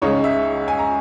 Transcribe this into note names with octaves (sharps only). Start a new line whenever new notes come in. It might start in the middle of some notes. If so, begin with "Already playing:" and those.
C#2 C#3 G#3 D#4 C#5
E5
G#5
A#5